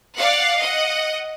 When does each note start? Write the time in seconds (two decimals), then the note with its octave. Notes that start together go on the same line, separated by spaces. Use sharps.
0.17 D5 F5 F#5
0.58 D#5 F#5